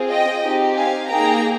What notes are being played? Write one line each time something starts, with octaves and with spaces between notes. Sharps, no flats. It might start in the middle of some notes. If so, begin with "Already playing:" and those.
Already playing: C4 F4 G#4
D#5 G5
C4 D#4 G4
F5 G#5
A#3 D#4 G#4 G5 A#5